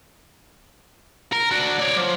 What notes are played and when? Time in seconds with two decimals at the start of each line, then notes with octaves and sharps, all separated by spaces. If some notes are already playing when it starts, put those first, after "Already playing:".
1.33 A#4
1.51 D4 F#4
1.80 C#5 D5
1.97 F3